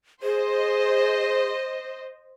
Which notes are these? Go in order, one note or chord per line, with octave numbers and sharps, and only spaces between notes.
G#4 C5 D#5